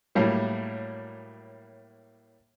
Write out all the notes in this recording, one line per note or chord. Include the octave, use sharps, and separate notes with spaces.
A2 F#3 G3 A#3